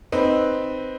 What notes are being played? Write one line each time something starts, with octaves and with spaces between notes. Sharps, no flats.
C4 D#4 B4